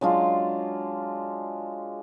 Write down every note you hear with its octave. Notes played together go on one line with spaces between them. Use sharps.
F#3 G#3 D4 F4